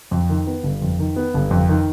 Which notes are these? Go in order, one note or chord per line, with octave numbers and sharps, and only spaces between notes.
F2
D#3
B3
G1
F2
D#3
B3
G1
F2
D#3